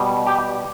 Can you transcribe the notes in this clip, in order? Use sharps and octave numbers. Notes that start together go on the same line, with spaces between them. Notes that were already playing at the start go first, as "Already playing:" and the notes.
Already playing: B2 G3
G4